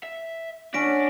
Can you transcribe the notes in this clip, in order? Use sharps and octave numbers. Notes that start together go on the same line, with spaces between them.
E5
C#4 D4 C#5 F#5 A#6 B6 D7